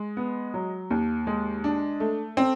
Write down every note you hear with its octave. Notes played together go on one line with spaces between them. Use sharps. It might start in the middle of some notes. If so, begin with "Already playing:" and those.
Already playing: G#3
B3
F#3
D#2
G#3
D4
A3
C4